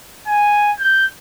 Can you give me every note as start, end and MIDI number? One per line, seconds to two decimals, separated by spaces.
0.27 0.72 80
0.80 1.05 91